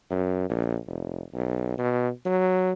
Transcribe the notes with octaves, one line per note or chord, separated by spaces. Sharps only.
F#2
A#1
F1
B1
B2
F#3